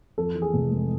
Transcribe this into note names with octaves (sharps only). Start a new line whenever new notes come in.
F2 A4
E3
G#4
F1
G#3